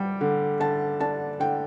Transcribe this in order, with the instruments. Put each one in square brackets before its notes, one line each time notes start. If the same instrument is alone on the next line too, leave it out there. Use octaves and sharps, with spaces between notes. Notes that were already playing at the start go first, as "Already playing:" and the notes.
Already playing: [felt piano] G3 G5
D3
D3 A5
D4 A5
D3 G5